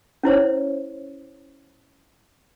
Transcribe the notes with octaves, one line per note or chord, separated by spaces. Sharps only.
C#4 E4 C5 C#5